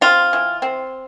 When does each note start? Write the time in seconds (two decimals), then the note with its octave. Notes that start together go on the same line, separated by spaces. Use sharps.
0.01 C4 F4
0.33 E3
0.62 C4